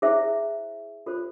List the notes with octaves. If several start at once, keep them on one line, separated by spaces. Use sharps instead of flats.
E4 G#4 C5 E5
F4 A4 C5